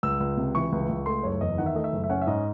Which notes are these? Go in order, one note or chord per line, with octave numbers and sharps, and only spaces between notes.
C#2 E6
C#2
C3
E3 C#6
C#2
C#2
A3 C6
F#1 C#5
E2 D#5
D#3 F#5
E5
A3 D#5
E5
F#1
E5
C#4 F#5
E5
G#2 D#5